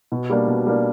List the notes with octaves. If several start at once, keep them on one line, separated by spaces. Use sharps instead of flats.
B2
G3 A#3 D4
B2
G3 A#3 D4